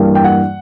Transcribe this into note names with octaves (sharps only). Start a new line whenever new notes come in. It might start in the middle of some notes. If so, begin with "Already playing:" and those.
Already playing: G2 E3 G3 A#3
G5
F#5